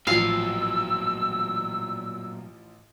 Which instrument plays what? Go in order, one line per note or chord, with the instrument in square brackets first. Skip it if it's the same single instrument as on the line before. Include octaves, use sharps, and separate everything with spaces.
[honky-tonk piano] A1 F3 [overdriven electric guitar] A#2 F#3 [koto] F5 [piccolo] E6